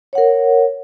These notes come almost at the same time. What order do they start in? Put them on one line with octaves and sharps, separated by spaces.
C#5 F#5 A#4